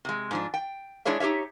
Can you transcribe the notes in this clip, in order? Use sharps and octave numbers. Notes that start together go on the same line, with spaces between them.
C3 G#3
G#2 F3 D4
G5
G#3 D4 E4 G#4 C#5 E5
D#4 G4 A4 C#5 E5